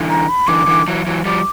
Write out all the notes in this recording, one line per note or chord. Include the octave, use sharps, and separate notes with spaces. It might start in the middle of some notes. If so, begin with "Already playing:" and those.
Already playing: D3 E3
A#5
B5
D3 E3 D6
D3 E3
E3 F#3
E3 F#3
F3 G3 D6